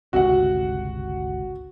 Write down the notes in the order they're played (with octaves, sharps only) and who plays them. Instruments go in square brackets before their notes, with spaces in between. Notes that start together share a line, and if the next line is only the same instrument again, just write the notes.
[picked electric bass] G1 C#2 C3 [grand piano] F#4 F#5